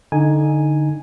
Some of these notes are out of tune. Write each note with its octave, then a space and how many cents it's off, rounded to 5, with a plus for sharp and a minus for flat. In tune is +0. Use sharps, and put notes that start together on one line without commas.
D3 +0 D#4 +0 G#5 +0